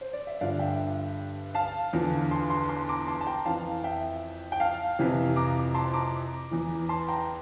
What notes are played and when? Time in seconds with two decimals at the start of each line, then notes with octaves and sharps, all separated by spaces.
0.01 C5
0.13 D5
0.27 E5
0.41 G2 D3 F3 D5 F5
0.59 E5 G5
1.55 F5 A5
1.93 E2 D3 F3
2.31 A5 C6
2.50 A5 C6
2.69 A5 C6
2.88 A#5 D6
3.07 A5 C6
3.21 A5
3.27 G5 A#5
3.46 F2 E3 F5 A5
3.84 E5 G5
4.52 G5
4.60 F5 A5
4.99 F2 C3 E3
5.36 A#5 D6
5.75 A5 C6
5.94 A#5 D6
6.51 E2 E3
6.89 A5 C6
7.08 G5 A#5